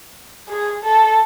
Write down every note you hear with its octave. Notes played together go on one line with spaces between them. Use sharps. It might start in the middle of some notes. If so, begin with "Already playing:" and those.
G#4
A4